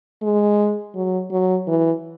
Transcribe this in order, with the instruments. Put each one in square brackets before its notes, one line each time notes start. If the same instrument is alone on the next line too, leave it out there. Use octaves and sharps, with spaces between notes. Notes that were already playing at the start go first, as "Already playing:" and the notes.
[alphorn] G#3
F#3
F#3
E3